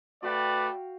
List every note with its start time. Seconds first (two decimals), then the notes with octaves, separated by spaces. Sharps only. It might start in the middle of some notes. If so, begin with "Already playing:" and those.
0.23 A3 F#4 B4 D5 F5 G5